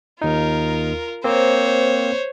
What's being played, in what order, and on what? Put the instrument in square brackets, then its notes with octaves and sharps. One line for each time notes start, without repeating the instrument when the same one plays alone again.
[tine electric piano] D#2 D#4 [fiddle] F4 A#4
[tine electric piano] A#3 C4 [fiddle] C5 C#5